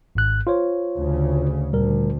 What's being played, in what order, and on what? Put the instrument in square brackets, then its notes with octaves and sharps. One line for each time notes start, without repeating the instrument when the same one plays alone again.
[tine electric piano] G#1 G#2 F#6
F4 C5 C#5
[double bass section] D2 C#3
[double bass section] D2 [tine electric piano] A#2 G3 A#4